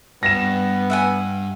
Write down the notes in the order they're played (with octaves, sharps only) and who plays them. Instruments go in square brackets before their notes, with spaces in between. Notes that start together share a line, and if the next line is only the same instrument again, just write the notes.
[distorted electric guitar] G2 [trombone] B3 [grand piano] A#6 E7
[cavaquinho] E5 F#5 G#5